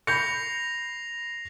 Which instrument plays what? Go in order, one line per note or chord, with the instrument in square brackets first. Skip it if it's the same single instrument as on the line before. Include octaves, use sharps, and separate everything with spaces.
[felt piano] B5 G6 C#7 [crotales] A#6 C7 F7